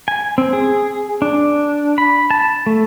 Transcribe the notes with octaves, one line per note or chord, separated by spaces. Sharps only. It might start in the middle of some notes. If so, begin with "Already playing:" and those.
G#5
C4
G#4
D4
B5
A5
A3